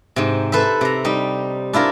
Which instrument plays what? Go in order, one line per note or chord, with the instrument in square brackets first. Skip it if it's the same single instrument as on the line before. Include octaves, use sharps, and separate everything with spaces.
[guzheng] G#2 C3
A4 B4 C5 E5
C3 A#5
G3 D#4
D4 E4 F4 A#4